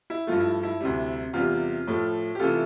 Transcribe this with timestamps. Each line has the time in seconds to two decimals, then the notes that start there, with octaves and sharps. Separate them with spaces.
0.10 E4
0.27 G2 F3 A3 F4
0.40 E4
0.63 E4
0.80 D2 C3 G3
1.33 E2 C3 G3 F4
1.87 A2 F3 A3
2.35 G4
2.40 C3 E3 A3 F4 A4